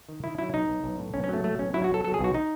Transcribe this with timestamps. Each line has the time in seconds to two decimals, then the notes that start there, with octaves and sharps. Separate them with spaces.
0.09 D#3
0.24 D#3 E4
0.38 F#3 E4
0.53 B1 D#4
0.68 B1
0.84 B1
0.99 A2
1.14 B1 C#4
1.24 C#4
1.29 F#3 A3
1.44 A2 A3
1.59 B1 C#4
1.74 F#3 E4
1.84 F#4
1.89 B1 A4
2.04 F#3 A4
2.14 G#4
2.19 B1
2.24 F#4
2.34 D#4